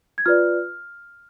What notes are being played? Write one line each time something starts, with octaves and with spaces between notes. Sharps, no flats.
G#6
F4 B4 D5 F6